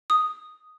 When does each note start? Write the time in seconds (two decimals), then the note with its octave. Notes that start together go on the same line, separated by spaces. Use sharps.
0.10 D#6